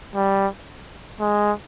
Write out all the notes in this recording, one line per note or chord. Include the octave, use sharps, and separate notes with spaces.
G3
G#3